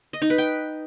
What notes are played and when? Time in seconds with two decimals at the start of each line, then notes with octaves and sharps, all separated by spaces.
0.13 D#5
0.22 D#4
0.30 B4
0.38 G5